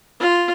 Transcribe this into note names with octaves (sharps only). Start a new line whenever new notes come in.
F4